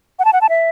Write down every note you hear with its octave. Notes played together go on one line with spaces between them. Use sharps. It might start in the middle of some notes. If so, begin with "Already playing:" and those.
F#5
A5
F#5
A5
E5